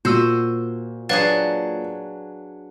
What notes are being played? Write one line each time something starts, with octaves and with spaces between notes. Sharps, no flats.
A#2 F#4 C5 E6 D#7
F#3 D4 G#4 B4 F5 A6